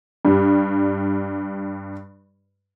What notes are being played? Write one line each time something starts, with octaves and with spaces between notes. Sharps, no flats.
G2 G3